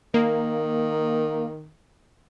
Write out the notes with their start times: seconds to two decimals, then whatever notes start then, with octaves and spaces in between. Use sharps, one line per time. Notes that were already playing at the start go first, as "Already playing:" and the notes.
0.14 D#3 A#3